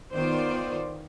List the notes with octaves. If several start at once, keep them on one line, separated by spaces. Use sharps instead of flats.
D#3 B3 F4 C5 D5